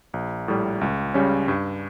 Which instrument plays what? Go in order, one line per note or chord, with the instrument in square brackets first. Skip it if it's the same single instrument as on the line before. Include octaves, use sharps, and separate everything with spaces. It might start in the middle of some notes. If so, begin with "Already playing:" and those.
[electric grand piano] A#1
A2 G3
C#2
C#3 G3 C#4
G2